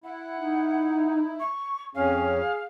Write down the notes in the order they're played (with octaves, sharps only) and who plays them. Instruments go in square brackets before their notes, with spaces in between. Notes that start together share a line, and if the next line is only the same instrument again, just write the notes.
[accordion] E4 [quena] F#5
[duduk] D#4
[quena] C#6
[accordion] F2 C#4 [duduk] G#4 [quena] F5